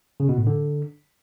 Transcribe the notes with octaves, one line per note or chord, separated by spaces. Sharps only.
C#3
B2
A2
D3